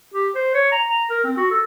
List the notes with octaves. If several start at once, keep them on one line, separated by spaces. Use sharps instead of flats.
G4
C5
C#5
A#5
A#5
A#4
C4
F#4
A4